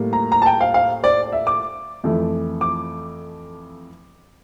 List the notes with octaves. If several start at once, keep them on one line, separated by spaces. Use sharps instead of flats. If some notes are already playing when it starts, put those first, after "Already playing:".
Already playing: A2 G3 A#3
A#5
A#5
A5
G5
F5
F5
D5
E5
D6
F2 E3 A3
D6